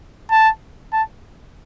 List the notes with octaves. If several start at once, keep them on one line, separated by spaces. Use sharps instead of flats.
A5
A5